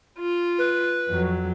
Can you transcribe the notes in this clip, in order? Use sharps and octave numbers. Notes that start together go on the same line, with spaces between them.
F4
B4
F2 F#3